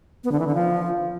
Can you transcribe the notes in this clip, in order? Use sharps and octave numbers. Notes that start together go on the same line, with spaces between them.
B3
D3
E3
D3
F3